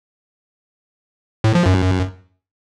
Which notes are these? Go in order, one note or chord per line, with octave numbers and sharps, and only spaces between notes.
A2
F3
F#2